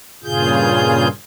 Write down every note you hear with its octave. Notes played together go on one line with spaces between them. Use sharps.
G2 A#2 C#3 F4 G#4 G6